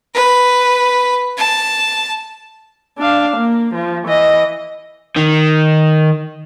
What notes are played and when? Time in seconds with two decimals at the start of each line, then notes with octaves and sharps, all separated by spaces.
0.14 B4
1.38 A5
2.98 D4 F5
3.37 A#3
3.74 F3
4.07 E3 D#5
5.16 D#3